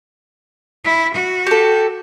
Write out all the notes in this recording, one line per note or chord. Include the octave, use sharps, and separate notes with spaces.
E4
F#4
G4 A4